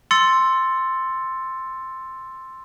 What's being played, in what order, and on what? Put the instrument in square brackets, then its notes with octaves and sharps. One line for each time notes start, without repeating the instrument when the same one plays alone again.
[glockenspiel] C6 E6 A6 C#7